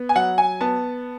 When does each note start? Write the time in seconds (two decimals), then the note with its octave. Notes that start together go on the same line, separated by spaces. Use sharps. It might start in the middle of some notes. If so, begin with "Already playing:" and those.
Already playing: B3
0.09 G#5
0.16 F#3 F#5
0.38 G#5
0.61 B3 A5